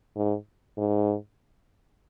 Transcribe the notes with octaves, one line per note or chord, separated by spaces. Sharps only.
G#2
G#2